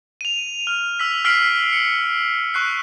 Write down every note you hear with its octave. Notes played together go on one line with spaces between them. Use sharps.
D#7 F7
F6
E6 B6
E6 F6 B6 C7 D7 F#7
C#7
C#6 F#6 C7